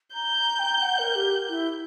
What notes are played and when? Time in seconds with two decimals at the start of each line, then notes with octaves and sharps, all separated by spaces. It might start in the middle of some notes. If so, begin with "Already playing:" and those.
0.14 A#5 G6
0.37 A#5
0.59 G5
0.82 F#5
0.99 A#4
1.15 G4
1.49 E4